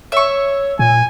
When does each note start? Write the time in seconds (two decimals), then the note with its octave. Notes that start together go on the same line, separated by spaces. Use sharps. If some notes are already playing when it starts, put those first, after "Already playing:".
0.12 C#5 E5 C#6
0.79 A#2 G#5